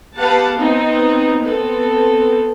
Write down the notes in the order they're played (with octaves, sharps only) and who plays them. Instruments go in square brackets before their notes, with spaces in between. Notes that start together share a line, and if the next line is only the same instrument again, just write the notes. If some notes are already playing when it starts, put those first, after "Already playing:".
[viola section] B3 G4 B4 F5 F#5 A5
B3 C4 D#4
B3 C4 A4